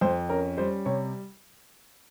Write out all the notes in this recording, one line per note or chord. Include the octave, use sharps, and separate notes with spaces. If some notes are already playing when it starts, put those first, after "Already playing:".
F2 C5
C#4 A#4
G3 C5
C3 C#5